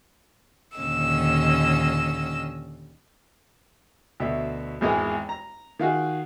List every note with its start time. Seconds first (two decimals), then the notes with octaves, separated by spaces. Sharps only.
0.77 D#2 A#2 D3 C#4 D#5 E6
4.20 D2 B2 E5
4.81 G#1 E2 G#3 G#4 A#4
5.29 A#5
5.79 D#3 F4 F#4 G#4